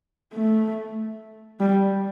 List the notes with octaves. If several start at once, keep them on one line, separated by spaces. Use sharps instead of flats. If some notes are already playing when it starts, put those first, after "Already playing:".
A3
G3